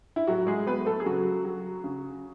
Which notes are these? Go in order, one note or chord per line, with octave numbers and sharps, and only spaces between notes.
E4
A2 F#3 F#4
G#3 G#4
F#3 B3 B4
A3 A4
G#4
C#3 F#3 F#4
F#3
C#3